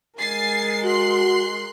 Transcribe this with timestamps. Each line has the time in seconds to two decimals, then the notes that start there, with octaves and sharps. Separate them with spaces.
0.19 G#3 A#4 G#5 A6 C7
0.84 F#4 C6 F#6 C7